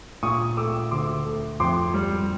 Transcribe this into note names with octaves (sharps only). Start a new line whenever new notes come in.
A#2 C#6 D#6
A3 D6 E6
D2 C6 D6
A3
F2 C6 D6
G3